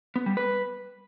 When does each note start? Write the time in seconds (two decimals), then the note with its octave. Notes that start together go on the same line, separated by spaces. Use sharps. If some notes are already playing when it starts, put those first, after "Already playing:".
0.16 B3
0.26 G3
0.37 B4